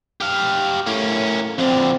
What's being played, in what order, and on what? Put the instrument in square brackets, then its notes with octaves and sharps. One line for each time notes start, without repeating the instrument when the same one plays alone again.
[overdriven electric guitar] G4 F5
[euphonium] A2 [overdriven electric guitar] A#3 C#4
[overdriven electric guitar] F2 D3 [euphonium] C4